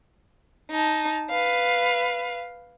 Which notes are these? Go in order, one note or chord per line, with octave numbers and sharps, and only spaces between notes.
D#4 A5
B4 F5